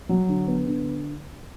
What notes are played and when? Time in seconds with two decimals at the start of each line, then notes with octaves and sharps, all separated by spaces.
0.09 F#3
0.29 D3
0.47 B3
0.67 D3